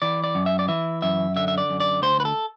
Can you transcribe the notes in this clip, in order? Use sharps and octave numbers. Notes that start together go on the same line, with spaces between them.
E3 D5
D5
F#2
E5
D5
E3 E5
F#2 E5
D3 E5
E5
D5
F#2
D5
D2 C5
B4
A4